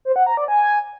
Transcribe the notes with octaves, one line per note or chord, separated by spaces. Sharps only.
C5
F#5
A#5
D5
G#5